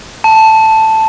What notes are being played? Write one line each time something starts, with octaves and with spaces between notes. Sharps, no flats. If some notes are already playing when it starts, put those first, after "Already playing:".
A5